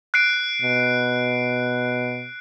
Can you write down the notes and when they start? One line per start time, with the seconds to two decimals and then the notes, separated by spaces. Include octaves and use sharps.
0.14 F#6 C7 D7
0.62 B2